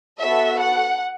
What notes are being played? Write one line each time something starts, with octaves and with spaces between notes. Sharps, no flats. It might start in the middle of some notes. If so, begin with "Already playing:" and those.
B3 F#4 A4 E5
F#5